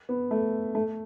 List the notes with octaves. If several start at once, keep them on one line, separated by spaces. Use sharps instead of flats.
B3
A3
A3